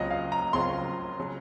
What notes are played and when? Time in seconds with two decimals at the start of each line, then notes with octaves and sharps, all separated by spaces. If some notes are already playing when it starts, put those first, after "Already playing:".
Already playing: C#2 C#3 F#3 C4 F4 D#5
0.11 F5
0.32 A#5
0.53 C#2 C#3 F#3 C4 F4 C6
1.19 C#3 F#3